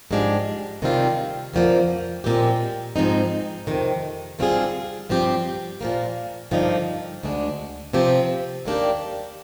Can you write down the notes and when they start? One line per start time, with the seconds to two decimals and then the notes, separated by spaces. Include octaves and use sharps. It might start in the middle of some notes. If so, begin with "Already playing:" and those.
0.11 G#2 F3 G#3 D4 G4
0.82 C3 D#3 G3 C4 F4
1.54 F2 D3 F3 A#3
2.24 A#2 G#3 C4 G4
2.96 G#2 F3 G#3 C4 D#4
3.67 F2 C3 D#3
4.39 D3 G3 C4 F4 G#4
5.09 G2 F3 C4 G4
5.81 A#2 F3 A#3
6.51 G2 D3 F3 A#3 D#4
7.23 D2 D3 G#3 D4
7.93 C3 F3 C4 G4
8.65 D#2 D#3 A#3 D4 G4